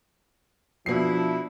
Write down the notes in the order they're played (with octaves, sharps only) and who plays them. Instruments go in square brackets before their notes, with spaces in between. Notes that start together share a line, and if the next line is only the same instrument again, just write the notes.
[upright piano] B2 C7 [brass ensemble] F3 D4 E4